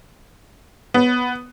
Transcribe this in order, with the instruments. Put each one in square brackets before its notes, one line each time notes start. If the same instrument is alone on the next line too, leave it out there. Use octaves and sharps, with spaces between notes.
[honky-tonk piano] B3